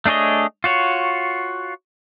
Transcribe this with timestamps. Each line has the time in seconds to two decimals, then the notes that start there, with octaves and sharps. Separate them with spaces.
0.06 A3 D4 G#4 C#5 D#5
0.64 F4 F#4 C#5